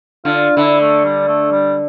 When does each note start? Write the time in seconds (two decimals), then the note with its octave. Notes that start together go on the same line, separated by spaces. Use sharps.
0.25 D3 F4
0.56 D3 E4
0.81 A3
1.04 G3
1.27 A3
1.52 G3